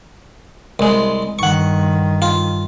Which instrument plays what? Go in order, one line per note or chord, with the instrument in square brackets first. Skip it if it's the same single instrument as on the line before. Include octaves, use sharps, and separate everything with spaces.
[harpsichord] C2 G#3
[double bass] G2 D#3 [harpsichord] F#5 C#6
[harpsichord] F4